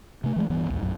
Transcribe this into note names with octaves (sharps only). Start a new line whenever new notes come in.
C3 A3
E3 G#3 A3
D1 G2 E3 B3
B1 E2 G#2
A#1 F#2